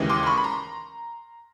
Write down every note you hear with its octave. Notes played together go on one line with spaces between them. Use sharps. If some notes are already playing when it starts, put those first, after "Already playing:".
Already playing: D#2 C#3 E3 G#3
C6 D6
C6
B5 C#6
B5
A#5 C6